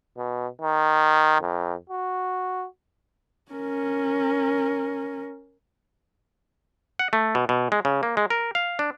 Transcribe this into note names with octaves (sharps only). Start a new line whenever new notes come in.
B2
D#3
F2
F#4
C#4 A#4
F#5
A3
B2
B2
G#3
C#3
A#3
G#3
A#4
F5
D4